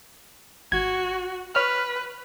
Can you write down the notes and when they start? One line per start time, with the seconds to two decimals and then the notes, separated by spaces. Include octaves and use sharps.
0.72 G#1 F#4 G#6
1.55 B4 C#5 F6